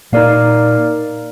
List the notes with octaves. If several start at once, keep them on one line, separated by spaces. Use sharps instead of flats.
A#2 A#3 D#4 A#4 D5 F5